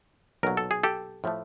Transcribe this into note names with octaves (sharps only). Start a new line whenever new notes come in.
B1 A#2 F#3 A#4
A4
G#4
G4 A4
A2 F3 A3